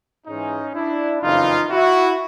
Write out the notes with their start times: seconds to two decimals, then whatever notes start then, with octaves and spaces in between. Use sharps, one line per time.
0.27 G#2 E3 G#3 C#4 D#4
0.75 D4 E4
1.22 F#1 F2 C#3 E3 D#4 F4
1.71 E4 F#4